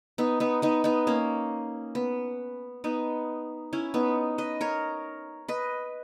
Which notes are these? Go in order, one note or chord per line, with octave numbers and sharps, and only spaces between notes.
B3 D#4
B3 D#4
B3 D#4
B3 D#4
A#3 C#4
B3
B3 D#4
C#4 E4
B3 D#4
B4 D#5
A#4 C#5
B4 D#5